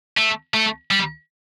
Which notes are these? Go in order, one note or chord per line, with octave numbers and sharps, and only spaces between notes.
A3
A3
G3